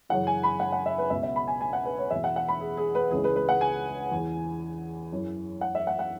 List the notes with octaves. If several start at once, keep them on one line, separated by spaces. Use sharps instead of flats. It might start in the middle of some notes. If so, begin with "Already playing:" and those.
F#2 C#3 E3 F#5
G#5
B5
F#5
F#5
E5
B4
C#2 B2 E5
E5
B5
G#5
G#5
F#5
B4
C#5
E2 B2 E5
F#5
F#5
B5
G#4
G#4
B4
C#2 C#3 E3 G#4
B4
B4
F#5
G#5
E2 E3
F#2 E3
F#5
E5
F#5
F#5